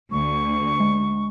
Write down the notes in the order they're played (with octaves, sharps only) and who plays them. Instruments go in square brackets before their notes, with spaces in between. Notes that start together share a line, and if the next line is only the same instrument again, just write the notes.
[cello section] D2 [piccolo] C#6
[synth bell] G#3